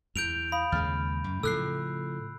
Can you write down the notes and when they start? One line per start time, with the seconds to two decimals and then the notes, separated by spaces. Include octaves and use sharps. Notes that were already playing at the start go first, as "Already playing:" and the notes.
0.16 E2 G6 D7 F7
0.52 F5 B5 D#6
0.72 D#2 C#3 G#3 F6 A6
1.24 F#2
1.43 A2 C#3 F3 A4 E6 F#6 C7